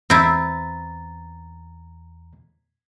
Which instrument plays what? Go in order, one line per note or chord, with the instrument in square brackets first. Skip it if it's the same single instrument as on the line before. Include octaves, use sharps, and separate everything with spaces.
[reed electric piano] E2 A#5 A6 [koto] C4 E4